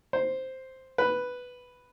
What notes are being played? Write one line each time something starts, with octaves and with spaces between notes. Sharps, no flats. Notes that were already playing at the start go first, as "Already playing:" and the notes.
C5
B4